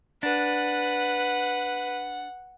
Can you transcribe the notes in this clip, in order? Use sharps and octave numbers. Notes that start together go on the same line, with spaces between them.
D4 B4 F#5